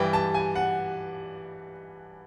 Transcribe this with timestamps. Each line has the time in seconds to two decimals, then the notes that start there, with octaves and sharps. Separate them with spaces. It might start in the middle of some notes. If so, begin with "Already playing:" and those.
Already playing: G2 E3 G3 G5
0.13 A5
0.34 G#5
0.55 F#5